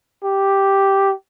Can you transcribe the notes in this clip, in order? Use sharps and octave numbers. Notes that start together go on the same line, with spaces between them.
G4